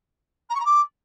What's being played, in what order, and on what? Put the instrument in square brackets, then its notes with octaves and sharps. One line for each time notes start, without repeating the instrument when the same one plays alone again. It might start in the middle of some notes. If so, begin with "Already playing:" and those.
[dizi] A#5
C#6
A#5
D6